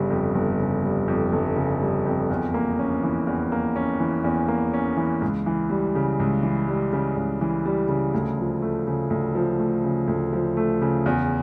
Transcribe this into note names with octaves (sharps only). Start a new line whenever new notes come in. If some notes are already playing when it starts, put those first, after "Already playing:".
Already playing: G1 C#3 G3
F2
G1
C#3
G3
F2
G1
C#3
G3
F2
E2
A#3
C#4
E3
E2
A#3
C#4
E3
E2
A#3
C#4
E3
C#2
E3
G3
C#3
C#2
E3
G3
C#3
C#2
E3
G3
C#3
D2
F3
A3
C#3
D2
F3
A3
C#3
D2
F3
A3
C#3
E2